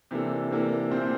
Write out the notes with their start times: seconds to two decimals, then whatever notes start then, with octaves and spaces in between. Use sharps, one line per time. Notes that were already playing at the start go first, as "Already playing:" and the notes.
0.11 C3 E3 A#3 D4 A4
0.51 C3 E3 A#3 D4 A4
0.90 A#2 A3 C4 G4 C5